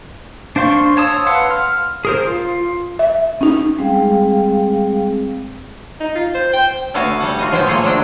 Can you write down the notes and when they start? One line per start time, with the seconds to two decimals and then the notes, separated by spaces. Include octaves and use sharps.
0.56 D4 C5 F5 C6 C#6
0.97 C#5 A5 D#6 E6
1.27 B4 F5 F#5 C6 E6
1.51 F6
2.05 G#4 A#4 C5
2.27 F4
2.99 E5
3.41 C#4 D#4
3.78 G3 G#3 C4 G#4 F5 G5
6.00 D#4
6.15 F4
6.34 C5
6.53 G5
6.94 D3 A3 B3 F#4 F5 G#5
7.20 G3 A4 F#5
7.38 F4 F#4 D#5
7.51 A2 F3 G#3 B3 C5 G5
7.66 A3 A#3 F4 G#4 A4 C#5
7.84 D3 F#3 A3 D4 D#5 G5